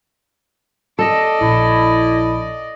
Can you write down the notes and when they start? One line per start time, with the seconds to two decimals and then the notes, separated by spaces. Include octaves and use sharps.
0.99 A4 D5 D#5
1.41 A#1 E4